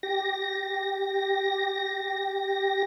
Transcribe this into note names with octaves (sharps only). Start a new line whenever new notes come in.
G4 A#6